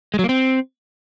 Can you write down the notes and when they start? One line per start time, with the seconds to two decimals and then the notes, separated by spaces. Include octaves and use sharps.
0.14 G#3
0.19 F#3
0.24 A#3
0.29 C4